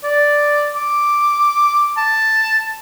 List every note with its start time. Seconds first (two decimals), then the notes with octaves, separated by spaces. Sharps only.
0.03 D5
0.75 D6
1.97 A5